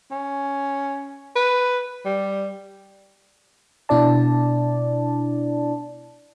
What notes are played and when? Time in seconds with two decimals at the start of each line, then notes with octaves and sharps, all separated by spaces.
0.11 C#4
1.36 B4
2.05 G3
3.89 B2 D4 E4 D5 A5